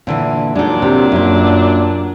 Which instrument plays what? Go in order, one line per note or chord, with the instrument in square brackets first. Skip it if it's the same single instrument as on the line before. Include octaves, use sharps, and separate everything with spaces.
[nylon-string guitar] A#2 D3 E3
[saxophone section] A#2 F#3 D4 [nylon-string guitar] G#3 D#4
[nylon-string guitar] C3
F#2 A#3